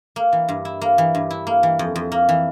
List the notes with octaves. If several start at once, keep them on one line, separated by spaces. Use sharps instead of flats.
A#3
E3
G2
E4
A#3
E3
G2
E4
A#3
E3
F2
F2
A#3
E3